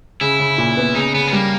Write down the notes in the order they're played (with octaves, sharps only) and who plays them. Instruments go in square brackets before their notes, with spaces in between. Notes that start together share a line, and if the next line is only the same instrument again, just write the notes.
[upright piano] C#3 [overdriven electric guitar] E4
[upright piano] C#3
A#2
B3
[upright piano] C#3 [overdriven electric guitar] D#4
[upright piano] C#3 [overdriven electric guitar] B3
[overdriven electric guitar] G#3
[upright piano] G3 [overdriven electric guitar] A#3